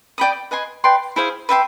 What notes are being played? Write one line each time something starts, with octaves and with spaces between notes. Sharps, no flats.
D5 G5 B5 D#6
B4 D#5 G#5 C6
B4 D5 G5 C6
E4 G#4 C5 F5
B4 E5 G5 C6